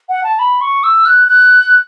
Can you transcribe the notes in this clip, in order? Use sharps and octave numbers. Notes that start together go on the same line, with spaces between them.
F#5
A5
B5
C#6
E6
F#6
F#6